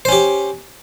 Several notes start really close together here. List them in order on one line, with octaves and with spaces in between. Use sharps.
C5 C#4 G4